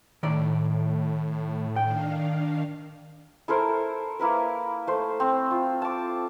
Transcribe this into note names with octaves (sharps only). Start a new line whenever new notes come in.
A2 D#3 D5
D#3 D4 F5 G5
E4 A4 A#4 C5
A#3 E4 A#4 B4
A3 C5
C4
F4
A5 D6